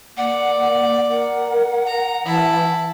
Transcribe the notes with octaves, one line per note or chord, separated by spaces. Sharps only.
A#3 D5 F#5
A#4 F#5
A#5
E3 E4 A5